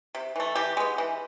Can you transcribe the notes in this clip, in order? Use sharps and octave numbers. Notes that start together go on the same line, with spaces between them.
C3
E3 A3
E3 G4
G#3 B3
E3